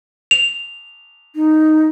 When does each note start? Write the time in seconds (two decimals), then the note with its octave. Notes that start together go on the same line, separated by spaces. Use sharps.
0.31 F7
1.35 D#4